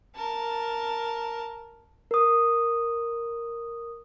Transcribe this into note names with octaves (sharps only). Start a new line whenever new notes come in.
A#4 A5
A#4 D#6